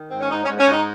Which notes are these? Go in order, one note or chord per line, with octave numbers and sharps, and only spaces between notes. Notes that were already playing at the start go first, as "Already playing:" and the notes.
Already playing: D#3
G#2 C4
C#4
G#2 D#4
C#4
G#2
C#4
G#2 D#4